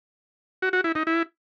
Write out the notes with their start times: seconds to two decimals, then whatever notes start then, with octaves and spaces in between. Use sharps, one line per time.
0.62 F#4
0.73 F#4
0.84 E4
0.95 D#4
1.07 E4